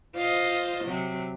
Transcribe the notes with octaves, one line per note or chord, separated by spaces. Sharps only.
F4 C5 D#5
C3 F#3